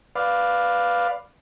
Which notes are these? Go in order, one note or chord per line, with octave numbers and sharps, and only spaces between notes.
B4 D5 F5